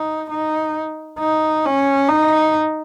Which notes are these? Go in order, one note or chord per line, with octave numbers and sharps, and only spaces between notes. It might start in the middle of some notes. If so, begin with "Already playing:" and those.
Already playing: D#4
D#4
D#4
C#4
D#4